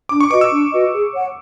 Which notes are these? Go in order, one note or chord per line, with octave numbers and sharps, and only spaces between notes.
D4 D6
C#6
F#4 B4 D#5 D6
E6
D4
F#4 B4 D#5
G#4
C#5 F#5